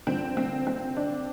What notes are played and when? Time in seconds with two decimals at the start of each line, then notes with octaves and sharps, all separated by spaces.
0.07 G2 D3 F3 C4
0.37 C4
0.67 C4
0.97 D4